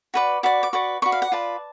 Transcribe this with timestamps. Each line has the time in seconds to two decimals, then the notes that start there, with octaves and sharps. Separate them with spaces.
0.14 F#4 B4 D5
0.43 F#4 B4 D5 D6
0.63 D6
0.73 F#4 B4 D5 C#6
1.02 F#4 B4 D5 C#6
1.12 F5
1.22 F#5
1.32 F4 B4 D5 A5